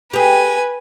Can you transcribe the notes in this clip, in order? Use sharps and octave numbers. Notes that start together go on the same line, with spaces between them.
G4 G#4 B4 G#5